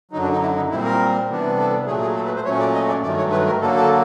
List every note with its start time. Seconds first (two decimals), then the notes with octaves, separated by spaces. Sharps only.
0.11 F#2 D3 F#3 D#4
0.21 D4
0.32 D#4
0.41 E4
0.56 D#4
0.70 A#2 G3 C4 E4
0.84 A#4
1.29 C3 E3 G3 B3 D4
1.58 A4
1.86 A#2 F#3 A3 G#4
2.01 G#4
2.15 A4
2.25 B4
2.35 C5
2.44 A#2 F#3 A3 C#4 C#5
2.60 D5
2.74 D#5
2.88 D5
3.03 G2 D#3 F#3 A3 D5
3.18 C#5
3.32 B4
3.46 A#4
3.61 D3 F#3 A#3 A4
3.76 A4